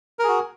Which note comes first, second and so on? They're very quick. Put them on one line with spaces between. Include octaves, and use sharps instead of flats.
A#4 G#4 F#4